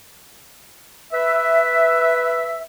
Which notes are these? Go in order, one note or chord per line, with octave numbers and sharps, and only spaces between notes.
B4 E5